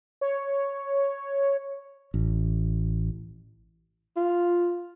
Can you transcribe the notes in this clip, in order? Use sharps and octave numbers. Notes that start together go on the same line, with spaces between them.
C#5
A1
F4